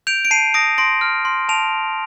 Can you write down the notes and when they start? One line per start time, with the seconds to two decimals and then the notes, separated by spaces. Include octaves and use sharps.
0.07 G6 D7 F7
0.25 D7
0.31 A5 C7 D#7
0.54 D#6 A#6 D7
0.78 C6 A#6 D7
1.01 F6
1.25 C6
1.49 A5 D7 F7